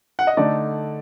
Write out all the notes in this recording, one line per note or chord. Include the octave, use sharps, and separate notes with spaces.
F#5
D#5
D3 A3 D#4 D5